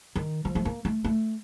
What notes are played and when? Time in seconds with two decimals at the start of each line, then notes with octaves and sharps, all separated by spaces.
0.15 D#3
0.45 F3
0.55 A3
0.65 A#3
0.85 A3
1.04 A3